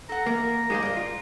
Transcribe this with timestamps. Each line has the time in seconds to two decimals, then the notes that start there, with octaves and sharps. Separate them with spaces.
0.09 A4 F#5 A#5
0.26 E3 A#3 A#4
0.70 G#3 A#3 D#4 G4 G#4 C5
0.82 G2 A#4 D#5
0.97 F4